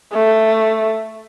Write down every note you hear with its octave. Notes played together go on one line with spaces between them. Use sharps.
A3